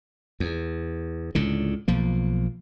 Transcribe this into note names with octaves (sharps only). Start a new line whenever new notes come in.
E2
C#2 A2 D3
B1 F3 A#3